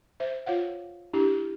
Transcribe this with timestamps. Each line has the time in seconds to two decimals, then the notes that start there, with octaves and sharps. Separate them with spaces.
0.20 C5 E5
0.46 F4 C#5 F5 F#5
1.13 D4 E4 G4